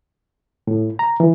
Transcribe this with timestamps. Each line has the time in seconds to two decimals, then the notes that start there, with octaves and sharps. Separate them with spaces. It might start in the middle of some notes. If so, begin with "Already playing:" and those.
0.67 A2
0.99 A#5
1.20 E3